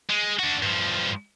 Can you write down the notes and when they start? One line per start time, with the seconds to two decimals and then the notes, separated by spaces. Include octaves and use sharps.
0.10 G#3
0.39 D4 F#4
0.62 G2 F3